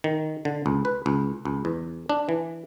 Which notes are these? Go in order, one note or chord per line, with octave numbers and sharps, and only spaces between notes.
D#3
D3
C#2
B4
C#2
C#2
E2
D4
E3